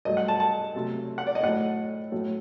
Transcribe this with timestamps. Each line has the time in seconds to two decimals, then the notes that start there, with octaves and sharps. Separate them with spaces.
0.05 G2 F#3 A3 D#5
0.17 F#5
0.28 A5
0.40 A5
0.75 C3 F#3 A3
1.18 F#5
1.27 D5
1.35 D#5
1.43 A2 F#3 A3 F#5
2.12 A2 F#3 A3